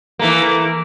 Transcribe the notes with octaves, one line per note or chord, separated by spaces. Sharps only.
E3 A3 A#3